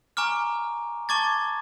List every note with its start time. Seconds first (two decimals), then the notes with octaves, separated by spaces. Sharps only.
0.17 G#5 A#5 C#6 D6 F6
1.09 A5 C#6 D6 G#6 A6